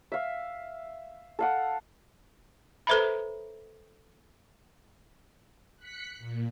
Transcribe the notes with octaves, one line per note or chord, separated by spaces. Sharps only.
E5 F5
A4 F5 F#5
A4 B4 C5 E5 A#5 B5
F#6 B6 C#7
A#2